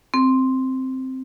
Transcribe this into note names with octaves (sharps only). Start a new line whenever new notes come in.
C4